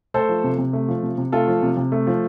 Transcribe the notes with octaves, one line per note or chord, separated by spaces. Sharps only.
A3 A4 C5
F3
C3
C3
A3
F3
C3
C3
A3 F4 A4
F3
C3
C3
A3
F3